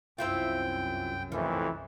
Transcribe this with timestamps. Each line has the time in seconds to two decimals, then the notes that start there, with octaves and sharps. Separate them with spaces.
0.18 C2 F#2 C4 E4 F4 G5
1.32 F2 A2 D#3 E3